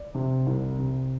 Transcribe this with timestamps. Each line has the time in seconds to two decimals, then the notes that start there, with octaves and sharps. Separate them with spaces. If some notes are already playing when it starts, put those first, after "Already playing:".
Already playing: D5
0.15 C3
0.46 C2
0.79 C3